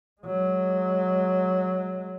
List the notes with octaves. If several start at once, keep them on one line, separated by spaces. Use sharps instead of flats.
F#3 G#3